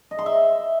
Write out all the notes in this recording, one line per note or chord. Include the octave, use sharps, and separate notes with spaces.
D#5
C6
E5